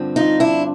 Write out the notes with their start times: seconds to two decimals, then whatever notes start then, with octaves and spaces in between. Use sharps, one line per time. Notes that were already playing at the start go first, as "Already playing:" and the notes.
Already playing: G2 D3 F3 C4
0.16 D#4 F4
0.40 D4 E4